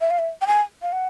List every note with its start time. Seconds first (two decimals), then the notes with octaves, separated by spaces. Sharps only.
0.01 E5
0.11 F5
0.19 E5
0.41 G5
0.47 G#5
0.82 F5
0.92 F#5